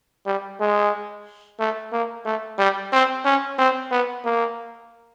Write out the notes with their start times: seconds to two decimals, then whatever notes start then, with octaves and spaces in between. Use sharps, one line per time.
0.26 G3
0.60 G#3
1.59 A3
1.93 A#3
2.26 A3
2.59 G3
2.93 C4
3.25 C#4
3.58 C4
3.91 B3
4.25 A#3